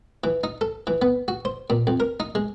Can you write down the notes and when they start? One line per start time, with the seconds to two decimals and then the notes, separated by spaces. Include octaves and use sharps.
0.24 E3
0.44 D#4
0.61 A4
0.87 E3
1.02 B3
1.28 F#4
1.45 C5
1.70 A#2
1.87 F2
2.00 A#4
2.20 D#4
2.35 G#3